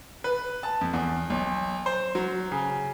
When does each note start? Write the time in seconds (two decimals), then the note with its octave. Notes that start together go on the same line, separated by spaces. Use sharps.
0.24 B4
0.63 A5
0.81 F2
0.93 E2
1.30 B1
1.86 C5
2.15 F#3
2.52 C#3